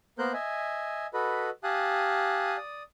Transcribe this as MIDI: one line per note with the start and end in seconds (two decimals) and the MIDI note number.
0.19 0.33 58
0.19 0.33 59
0.19 0.33 70
0.19 0.33 72
0.19 0.33 90
0.19 0.33 91
0.33 1.07 75
0.33 1.07 76
0.33 1.07 80
1.14 1.50 66
1.14 1.50 69
1.14 1.50 71
1.14 1.50 75
1.14 1.50 83
1.64 2.57 67
1.64 2.57 77
1.64 2.57 80
1.64 2.57 81
1.64 2.57 87
1.64 2.57 90
2.57 2.83 74
2.57 2.83 87